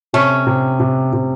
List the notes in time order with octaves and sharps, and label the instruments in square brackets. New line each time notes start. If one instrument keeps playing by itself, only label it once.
[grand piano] C3 [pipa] A3 C#4
[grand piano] C3
C3
C3